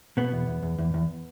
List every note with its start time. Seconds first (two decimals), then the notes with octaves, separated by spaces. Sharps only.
0.17 B2 B3
0.32 E2
0.47 E2
0.62 E2
0.78 E2
0.94 E2